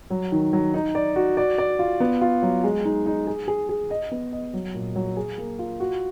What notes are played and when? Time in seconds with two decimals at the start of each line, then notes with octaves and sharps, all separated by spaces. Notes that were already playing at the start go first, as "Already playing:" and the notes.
0.10 F#3
0.32 D#3
0.53 F#3
0.74 D#4
0.95 D5
1.16 F#4
1.37 D5
1.58 D5
1.79 F4
2.00 B3
2.21 F4
2.42 F#3
2.64 G#3
2.85 D#4
3.06 D#4
3.27 G#4
3.48 G#4
3.69 G#4
3.90 D#5
4.11 B3
4.32 D#5
4.54 F#3
4.74 A#2
4.96 F#3
5.17 G#4
5.38 A#3
5.59 F4
5.80 F#4